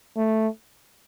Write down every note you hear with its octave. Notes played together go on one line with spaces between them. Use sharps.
A3